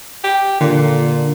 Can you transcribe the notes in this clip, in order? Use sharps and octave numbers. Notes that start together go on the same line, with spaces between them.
G4
A#2 D3